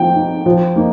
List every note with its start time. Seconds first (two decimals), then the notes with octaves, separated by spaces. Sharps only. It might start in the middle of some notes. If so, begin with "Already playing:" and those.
Already playing: F3 D#4 G5
0.16 D#4
0.46 F3
0.76 A#3 D#4